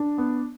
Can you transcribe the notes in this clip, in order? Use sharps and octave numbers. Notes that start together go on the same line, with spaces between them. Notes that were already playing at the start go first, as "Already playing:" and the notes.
Already playing: D4
B3